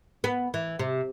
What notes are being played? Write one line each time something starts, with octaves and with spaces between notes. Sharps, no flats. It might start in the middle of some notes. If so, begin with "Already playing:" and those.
B3
E3
C3